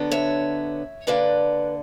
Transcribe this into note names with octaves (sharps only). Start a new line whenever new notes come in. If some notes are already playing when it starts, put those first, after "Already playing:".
Already playing: D3 F#3 B3 D4
C#5 E5
D3 A#3 D4 B4 D5